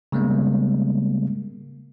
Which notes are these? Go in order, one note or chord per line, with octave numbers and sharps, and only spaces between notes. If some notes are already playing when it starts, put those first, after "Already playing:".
C#3 G3 G#3 A#3 B3